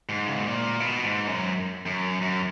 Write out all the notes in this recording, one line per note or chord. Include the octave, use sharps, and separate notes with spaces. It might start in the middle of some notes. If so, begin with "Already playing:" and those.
G#2
C#3
B2
A#2
B2
G#2
F#2
F#2
F#2